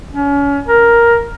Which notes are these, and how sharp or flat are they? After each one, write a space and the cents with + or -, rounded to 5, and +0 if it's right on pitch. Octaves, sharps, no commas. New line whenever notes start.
C#4 +35
A#4 +5